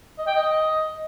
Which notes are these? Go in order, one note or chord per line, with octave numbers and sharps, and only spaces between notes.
D#5
G5
D#5